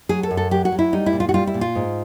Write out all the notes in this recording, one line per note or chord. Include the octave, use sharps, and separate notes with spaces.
F#3 G#4
A4
F#2
A4
F#3 G4
F#4
F#3
E4
G3 D#4
E4
A#2
F4
F#4
G3 F4
E4
A#2
F4
G#2